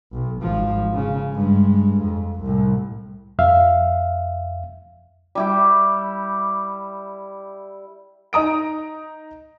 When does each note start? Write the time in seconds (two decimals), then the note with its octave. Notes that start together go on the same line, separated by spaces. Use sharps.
0.13 B1
0.41 G#1 F3
0.93 C#3
1.33 G2 G#3
2.01 F2
2.42 C2 A2
3.39 F2 E5 F5
5.35 G3 E4 G4
8.33 D#4 D#5 A#5 D#6 D7